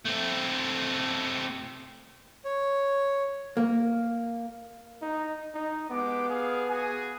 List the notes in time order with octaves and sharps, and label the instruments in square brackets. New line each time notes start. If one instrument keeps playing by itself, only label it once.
[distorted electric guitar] A3 C4
[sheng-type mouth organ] C#5
[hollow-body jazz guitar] A#3
[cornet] D#4
D#4
[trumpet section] G#3 G4 D6 [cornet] B3
[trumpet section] G#4 F5
F#4 G#4 G#5